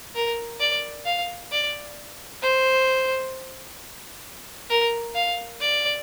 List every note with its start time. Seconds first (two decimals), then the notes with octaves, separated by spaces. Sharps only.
0.15 A#4
0.60 D5
1.06 F5
1.52 D5
2.42 C5
4.69 A#4
5.15 F5
5.60 D5